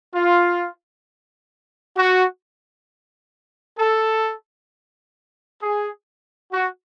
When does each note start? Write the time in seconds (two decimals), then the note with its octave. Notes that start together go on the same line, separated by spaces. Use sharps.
0.15 F4
1.97 F#4
3.79 A4
5.61 G#4
6.52 F#4